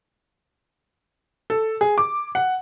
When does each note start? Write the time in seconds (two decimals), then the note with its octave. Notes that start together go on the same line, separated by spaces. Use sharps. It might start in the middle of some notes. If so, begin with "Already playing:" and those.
1.50 A4
1.81 G#4
1.98 D6
2.35 F#5